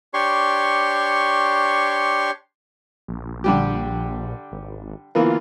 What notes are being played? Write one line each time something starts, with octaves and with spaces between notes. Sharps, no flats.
D4 G4 C#5 C6 C#6
A#1
D3 G3 G4
G#1
E3 A#3 B3 F4